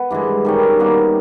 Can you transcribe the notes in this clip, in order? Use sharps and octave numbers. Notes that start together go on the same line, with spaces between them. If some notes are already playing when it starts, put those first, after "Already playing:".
Already playing: B3
G2 E3 G#3
D#3 G3 C#4
B2 G3 A#3